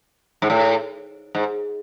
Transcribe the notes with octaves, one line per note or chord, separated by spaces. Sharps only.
G#2
A2
G#2